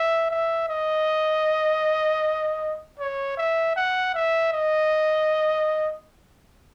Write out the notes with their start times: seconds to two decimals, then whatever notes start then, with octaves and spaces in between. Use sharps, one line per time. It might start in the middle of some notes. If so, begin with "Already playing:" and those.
Already playing: E5
0.31 E5
0.69 D#5
3.00 C#5
3.37 E5
3.76 F#5
4.14 E5
4.53 D#5